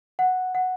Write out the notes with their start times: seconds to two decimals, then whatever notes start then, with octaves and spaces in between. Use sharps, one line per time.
0.19 F#5
0.55 F#5